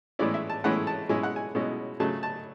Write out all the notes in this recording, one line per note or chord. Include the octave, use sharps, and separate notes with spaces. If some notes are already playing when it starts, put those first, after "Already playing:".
A2 E3 G#3 C#4 E4 D5
E5
A5
A2 E3 G#3 C#4 E4 F#5
A5
B2 G#3 C#4 E4 G#5
F#5
G#5
B2 G#3 C#4 E4
C#3 F#3 A3 A5
A5